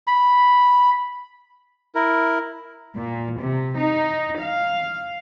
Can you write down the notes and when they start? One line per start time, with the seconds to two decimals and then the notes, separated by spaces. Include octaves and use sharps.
0.07 B5
1.95 E4 A#4
2.96 A#2
3.39 C3
3.75 D#4
4.41 F5